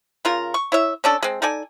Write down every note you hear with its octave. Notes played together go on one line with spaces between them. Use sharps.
C#3 F4 A#4
C#6
E4 C#5 E5
C#4 D4 A4
G#3 C4
D#4 A4 D5 G#5